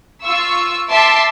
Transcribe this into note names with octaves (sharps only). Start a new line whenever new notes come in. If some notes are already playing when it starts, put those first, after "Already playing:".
F4 C#6 E6
E5 A5 C6 D6